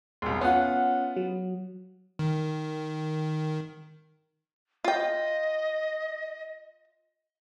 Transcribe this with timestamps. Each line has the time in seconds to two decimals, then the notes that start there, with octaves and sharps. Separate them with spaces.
0.22 E1 C2 C6
0.41 B3 C#4 F4 F#5
1.16 F#3
2.19 D#3
4.84 F4 D#5 G5